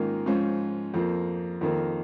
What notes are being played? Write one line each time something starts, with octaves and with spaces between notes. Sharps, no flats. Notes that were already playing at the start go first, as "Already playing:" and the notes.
Already playing: G#2 D#3 A#3 C#4 F4
G#2 F3 C#4 F4
F2 F3 A#3
F2 D#3 A#3